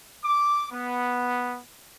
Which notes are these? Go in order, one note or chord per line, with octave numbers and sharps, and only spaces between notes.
D6
B3